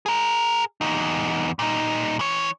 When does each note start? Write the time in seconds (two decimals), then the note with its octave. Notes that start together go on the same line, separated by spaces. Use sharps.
0.06 G#4 A#4
0.81 E2 D#4
1.59 A#2 D#4
2.19 E3 C#5